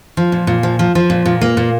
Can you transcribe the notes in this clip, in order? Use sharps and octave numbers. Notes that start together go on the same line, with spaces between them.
F3
A#2
A#2
F3
F3
F3
A#2
A#2
A#3
A#2